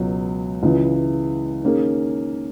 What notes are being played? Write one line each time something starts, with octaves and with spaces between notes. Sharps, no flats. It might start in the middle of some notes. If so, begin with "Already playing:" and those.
Already playing: C#2 B2 F#3
C#2 C#3 E3
D#3 A#3 C#4 G#4